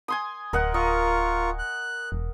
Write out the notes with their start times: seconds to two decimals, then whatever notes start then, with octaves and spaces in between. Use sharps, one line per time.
0.08 G#5 C6 D#6
0.53 D1 A#4 D#5 F#5
0.74 F4 A#4 D#5 C#6
1.59 F#6
2.12 E1